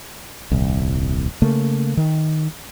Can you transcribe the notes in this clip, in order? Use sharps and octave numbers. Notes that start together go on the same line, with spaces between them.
D#1 C2
C#3 A3 A#3
D#3